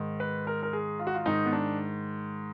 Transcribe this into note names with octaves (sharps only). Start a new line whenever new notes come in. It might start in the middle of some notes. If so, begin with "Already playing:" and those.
Already playing: G#2 D#3
B4
A#4
A#4
G#4
F4
F#4
F4
G#2 D#3 D#4
B3
D4